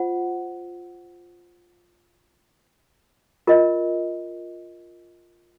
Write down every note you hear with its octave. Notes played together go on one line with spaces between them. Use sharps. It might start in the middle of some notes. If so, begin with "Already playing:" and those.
Already playing: F4 C5 F#5
F4 A#4 D#5